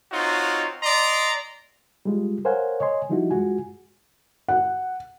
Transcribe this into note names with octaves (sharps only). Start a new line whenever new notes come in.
C4 D#4 F4 F#4 C#5
D5 D#5 A#5 C6
G3 G#3 F4
A#4 C5 C#5 F5 F#5 G#5
C#5 D#5 G#5 C6
E3 F3 G3 D#4 E4 F#4
F#2 G#3 F4 F#4 G#5
F#5